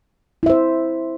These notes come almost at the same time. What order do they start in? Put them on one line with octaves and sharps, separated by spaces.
E4 E5 C5